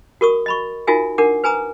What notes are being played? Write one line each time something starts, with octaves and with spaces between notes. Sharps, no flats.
F#4 A#4 C#6 D#6
D#5 B5 C#6
D#4 F4 F#4 A#4 E5 G#5
D4 A#4 F#5 D6
B4 G#5 A#5 D#6